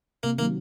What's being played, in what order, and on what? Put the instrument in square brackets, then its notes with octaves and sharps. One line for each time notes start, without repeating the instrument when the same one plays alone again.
[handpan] C3 [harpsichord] A#3
[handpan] D#3 [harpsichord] A#3
[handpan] F#3